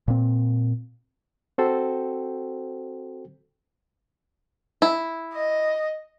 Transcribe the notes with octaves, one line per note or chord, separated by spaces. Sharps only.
A#2 C4
C4 F#4 A4 C5 G5
E4
D#5